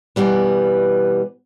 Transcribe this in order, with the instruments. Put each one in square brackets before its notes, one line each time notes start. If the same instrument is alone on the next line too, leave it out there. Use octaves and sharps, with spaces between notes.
[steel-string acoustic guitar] B2 E3 G3 B3